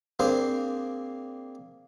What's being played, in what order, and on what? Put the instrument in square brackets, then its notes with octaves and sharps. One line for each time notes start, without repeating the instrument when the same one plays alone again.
[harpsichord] A#3 C4 D4 G#4 C5